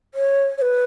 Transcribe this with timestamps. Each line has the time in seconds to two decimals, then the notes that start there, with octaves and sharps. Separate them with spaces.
0.15 C#5
0.58 C#5
0.62 B4